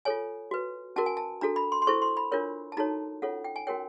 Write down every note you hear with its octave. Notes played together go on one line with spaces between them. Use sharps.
F4 A4 C#5 G#5
F#4 B4
C#4 F#4 A#4 A5
G#5
A5
D4 F#4 A4 A#5
B5
C6
C6
E4 A4 C5 C#6
C6
B5
D4 F4 A#4 C#5
A5
D#4 F#4 A4 C#5 A#5
C#4 F4 A4 C#5 F#5
G5
G#5
C#4 F#4 A#4 C#5 G5